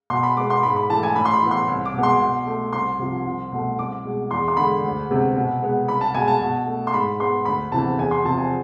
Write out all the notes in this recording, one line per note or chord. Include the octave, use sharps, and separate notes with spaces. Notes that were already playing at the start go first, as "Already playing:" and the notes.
B2 C6
B5
G#3 B3 D6
C6
G#2 B5
B5
E3 A3 A5
G#5
A2 B5
C6
B5
E3 B3
C6
C2
D6
B2 G#3 B3
C6
B2
A3
C2 C6
C3 F3
C2
B2 A3
C2 D6
B2 G#3
E2 C6
C6
D3 G#3 B5
D2
C3 G#3 B3
B2
G#3 B3
C2 B5
A5
B2 G#3 G#5
A5
B2
A3
C6
G#2 B5
G#3 B3 C6
D2 B5
C3 E3 B3 A5
E2 G#5
C6
C3 F3 A5
G#5